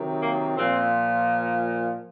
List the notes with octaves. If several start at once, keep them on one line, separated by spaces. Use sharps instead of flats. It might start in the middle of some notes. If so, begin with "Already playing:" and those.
Already playing: C3 D#3 F#3
A#3
A#2 F3 C4